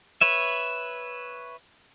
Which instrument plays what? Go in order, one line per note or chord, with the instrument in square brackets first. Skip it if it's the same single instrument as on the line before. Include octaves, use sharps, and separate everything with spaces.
[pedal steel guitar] B4 C#5 E5